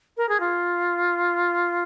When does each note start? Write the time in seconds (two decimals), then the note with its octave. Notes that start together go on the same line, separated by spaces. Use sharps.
0.17 A#4
0.29 G#4
0.40 F4